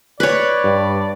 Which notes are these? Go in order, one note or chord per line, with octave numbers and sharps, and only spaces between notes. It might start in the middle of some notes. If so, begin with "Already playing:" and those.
B4 C#5 D5
G2